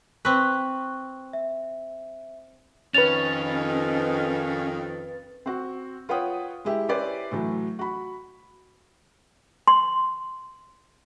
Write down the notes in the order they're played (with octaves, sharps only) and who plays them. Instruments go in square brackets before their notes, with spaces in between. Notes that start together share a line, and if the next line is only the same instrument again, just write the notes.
[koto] C4 B4 [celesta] C#6 F#6
[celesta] E5
[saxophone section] F2 D#3 [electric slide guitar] C#4 [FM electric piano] B4 A6 [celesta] F7
[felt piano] C4 F#4
F4 B4 C#5 F#5 G5 D#6
G#3 E4 G4
C#4 E4 G4 B4 C5 D5
A2 E3 F#3
F#4 B5
[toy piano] C6